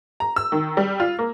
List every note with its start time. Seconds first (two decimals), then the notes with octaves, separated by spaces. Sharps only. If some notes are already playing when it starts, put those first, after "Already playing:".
0.20 A#5
0.36 E6
0.52 D#3
0.77 G3
1.00 F4
1.19 A#3